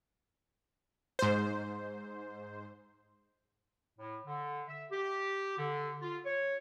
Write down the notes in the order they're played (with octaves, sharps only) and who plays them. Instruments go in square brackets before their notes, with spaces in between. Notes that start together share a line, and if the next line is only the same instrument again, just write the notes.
[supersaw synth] G#2 C5
[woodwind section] A2
D3
E5
G4
D3
F4
C#5